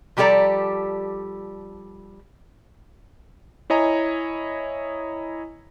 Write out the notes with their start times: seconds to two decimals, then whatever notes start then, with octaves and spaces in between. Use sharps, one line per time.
0.17 F3 G3 G4 A4 D5 A#5
3.70 E4 C#5 D#5 G#5 A#5